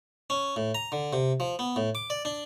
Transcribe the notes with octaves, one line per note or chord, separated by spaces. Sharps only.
C#4
A2
A#5
D3
C3
F3
B3
A2
D6
D5
D4